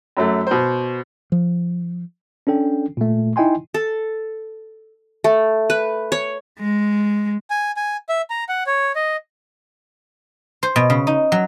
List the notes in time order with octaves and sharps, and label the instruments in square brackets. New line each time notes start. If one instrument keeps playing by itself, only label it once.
[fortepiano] F#2 F#3 A3
B2 C5
[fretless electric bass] F3
[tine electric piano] C#4 D4 A4 G5
A#2 A3
D#4 E4 D#5 G5 G#5 C6
[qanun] A4
A3
B4
C#5
[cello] G#3
[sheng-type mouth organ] G#5
G#5
E5
A#5
F#5
C#5
D#5
[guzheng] C5
B2
C#3
D#4
F#3